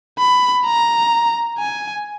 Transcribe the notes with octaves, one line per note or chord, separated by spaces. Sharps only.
B5
A#5
G#5